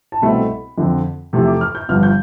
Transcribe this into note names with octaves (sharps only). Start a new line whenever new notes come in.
A5
C2 B2 A3 C4 B5
F2 D3 F3 C4
E2 C3 F3 A3
D6
F6
G6
G1 G2 F3 F6
G6